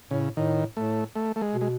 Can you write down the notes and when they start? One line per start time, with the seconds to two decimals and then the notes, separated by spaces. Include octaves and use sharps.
0.10 A2 C#3
0.37 A2 D#3
0.76 A2 A3
1.16 A3
1.36 A3
1.41 G#3
1.54 B2
1.61 G#3